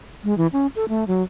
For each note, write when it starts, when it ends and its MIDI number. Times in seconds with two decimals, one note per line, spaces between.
0.24 0.36 56
0.38 0.47 52
0.53 0.67 61
0.76 0.85 69
0.89 1.07 57
1.07 1.23 54